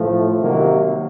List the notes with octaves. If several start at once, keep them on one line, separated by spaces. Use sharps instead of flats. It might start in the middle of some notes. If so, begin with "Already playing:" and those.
Already playing: A2 F3 A3
C3 D#3 F#3 A#3